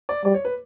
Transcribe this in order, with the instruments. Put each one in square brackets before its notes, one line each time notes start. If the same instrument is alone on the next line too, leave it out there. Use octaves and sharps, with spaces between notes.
[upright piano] D5
[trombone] G3 [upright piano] D5
[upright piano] C#5
B4